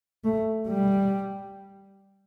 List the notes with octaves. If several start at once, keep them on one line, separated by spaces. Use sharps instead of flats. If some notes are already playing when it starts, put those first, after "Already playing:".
A3
G3